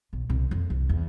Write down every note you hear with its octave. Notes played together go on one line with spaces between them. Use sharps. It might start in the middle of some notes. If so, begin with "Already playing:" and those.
B1
C2
F2
C2
E2